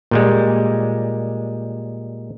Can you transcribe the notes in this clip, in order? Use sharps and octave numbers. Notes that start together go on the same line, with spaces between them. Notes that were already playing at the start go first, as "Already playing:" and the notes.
A#2 G3 G#3